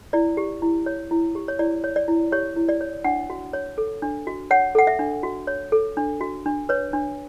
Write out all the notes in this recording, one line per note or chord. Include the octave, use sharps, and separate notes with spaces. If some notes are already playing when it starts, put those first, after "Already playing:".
E4 D5
G4
E4
C#5
E4
G4
C#5
E4 D5
C#5
D5
E4
G4 C#5
E4
D5
C#5
D4 F#5
F#4
C#5
A4
D4
F#4
C#5 F#5
A4 F#5
E5
D4
F#4
C#5
A4
D4
F#4
D4
B4 C#5
D4